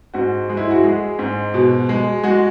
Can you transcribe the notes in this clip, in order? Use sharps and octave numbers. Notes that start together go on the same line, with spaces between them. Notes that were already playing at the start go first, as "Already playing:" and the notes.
G#2 F#4
G#3
E4
F#4
G#3 G#4
G#2
B2
G#3
G#3 F#4